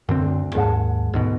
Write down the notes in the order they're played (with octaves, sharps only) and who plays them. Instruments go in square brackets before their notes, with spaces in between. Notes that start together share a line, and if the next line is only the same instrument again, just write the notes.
[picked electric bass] F#2 D3 C4
[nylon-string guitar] D2
[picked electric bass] D#2 [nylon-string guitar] G#2 F#5 A5
[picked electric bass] D2 G#2 B2